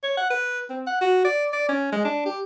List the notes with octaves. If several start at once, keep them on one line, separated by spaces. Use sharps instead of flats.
C#5
F#5
B4
C4
F#5
F#4
D5
D5
C#4
G#3
D4
G4